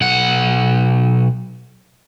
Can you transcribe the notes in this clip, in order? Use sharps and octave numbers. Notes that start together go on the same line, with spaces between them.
B1 F#5